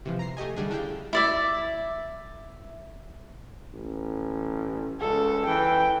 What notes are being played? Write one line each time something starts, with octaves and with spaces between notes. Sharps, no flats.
C3 E3 F3
A#5 C7
A3 G4 D#5 G#5
D3 G3 D4 G#4
C#3 D4 E4 F5 G5
E4 D5 E5
A1
C#2 A4
E3 G5